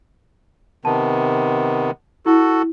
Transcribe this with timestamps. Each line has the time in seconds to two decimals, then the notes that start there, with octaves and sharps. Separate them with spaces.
0.85 C3 D#3 B3 A5
2.26 E4 F#4 A4